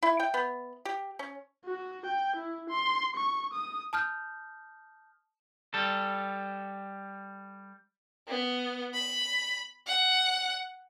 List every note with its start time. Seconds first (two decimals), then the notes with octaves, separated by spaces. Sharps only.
0.03 E4
0.20 G5
0.34 B3
0.85 G4
1.19 C#4
1.65 F#4
2.06 G5
2.36 E4
2.70 C6
3.16 C#6
3.53 D#6
3.93 A5 D#6 F6 G6
5.74 G3 A4
8.28 B3
8.94 B5
9.87 F#5